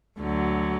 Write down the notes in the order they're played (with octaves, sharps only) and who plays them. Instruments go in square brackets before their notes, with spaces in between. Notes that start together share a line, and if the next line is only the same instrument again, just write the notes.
[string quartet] D2 D3 F#3